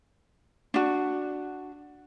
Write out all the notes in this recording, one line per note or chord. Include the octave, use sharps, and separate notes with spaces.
D4 F#4